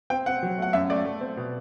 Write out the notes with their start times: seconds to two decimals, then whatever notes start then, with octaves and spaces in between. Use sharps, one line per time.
0.10 C4 G5
0.26 C4 F#5
0.43 F#3
0.58 A3 F#5
0.73 F#2 E5
0.90 A3 D5
1.05 A3
1.21 C4
1.37 B2